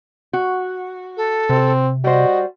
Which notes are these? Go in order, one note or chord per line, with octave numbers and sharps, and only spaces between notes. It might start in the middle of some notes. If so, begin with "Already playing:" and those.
F#4
A4
C3 C4
G3 F#4 C5 D#5